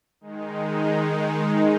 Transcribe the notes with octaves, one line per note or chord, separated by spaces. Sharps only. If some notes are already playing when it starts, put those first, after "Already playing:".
D#3 G#3 D#4